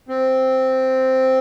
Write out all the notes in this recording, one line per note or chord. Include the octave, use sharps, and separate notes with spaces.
C4